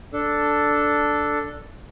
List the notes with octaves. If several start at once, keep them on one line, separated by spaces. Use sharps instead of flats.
D4 A4